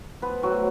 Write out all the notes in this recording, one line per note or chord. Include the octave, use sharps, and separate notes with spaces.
F3 B3 B4
A2 F#3 F#4